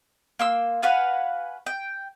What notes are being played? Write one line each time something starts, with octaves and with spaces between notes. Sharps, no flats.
A#3 C6 E6
F#4 B4 F5 G#5
G5